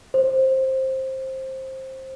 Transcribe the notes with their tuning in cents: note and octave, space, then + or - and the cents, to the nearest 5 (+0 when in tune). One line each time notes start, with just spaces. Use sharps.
C5 +15